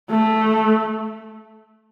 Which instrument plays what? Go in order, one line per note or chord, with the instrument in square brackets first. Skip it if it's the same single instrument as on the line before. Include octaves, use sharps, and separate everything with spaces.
[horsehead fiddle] A3